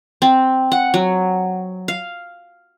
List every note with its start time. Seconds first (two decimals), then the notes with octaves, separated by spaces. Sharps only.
0.22 C4
0.72 F#5
0.94 F#3
1.88 F5